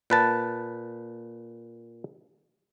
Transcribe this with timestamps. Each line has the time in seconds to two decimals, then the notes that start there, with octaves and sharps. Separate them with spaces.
0.10 A#2 B4 A5